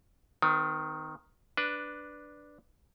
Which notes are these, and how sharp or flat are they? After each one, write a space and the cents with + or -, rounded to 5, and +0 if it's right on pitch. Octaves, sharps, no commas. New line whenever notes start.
D#3 +0 C4 -45
D4 +0 B4 +0